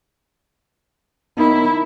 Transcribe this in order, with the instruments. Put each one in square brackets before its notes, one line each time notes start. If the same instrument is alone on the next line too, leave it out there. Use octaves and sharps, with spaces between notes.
[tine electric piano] B3 D#4 A#4 [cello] E4